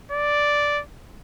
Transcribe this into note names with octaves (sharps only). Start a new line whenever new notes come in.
D5